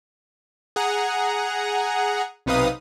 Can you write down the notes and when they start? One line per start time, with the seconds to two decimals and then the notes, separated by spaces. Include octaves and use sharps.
0.76 G#4 F#5 A#5
2.46 B1 C3 D#4 B4 F5 D#6